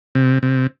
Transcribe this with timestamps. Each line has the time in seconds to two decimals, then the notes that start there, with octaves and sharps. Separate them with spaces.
0.15 C3
0.43 C3